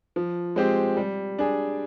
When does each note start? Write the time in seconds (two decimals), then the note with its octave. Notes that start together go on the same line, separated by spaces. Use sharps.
0.16 F3
0.56 G#3 C4 G4
0.97 G3
1.39 D4 G#4